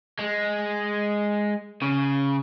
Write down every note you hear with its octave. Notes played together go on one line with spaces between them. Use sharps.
G#3
C#3